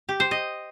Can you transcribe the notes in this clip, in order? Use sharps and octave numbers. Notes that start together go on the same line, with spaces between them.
G4
C5
D#5